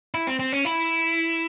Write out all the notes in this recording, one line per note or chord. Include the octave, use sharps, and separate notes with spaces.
E4
C4
C4
C#4
E4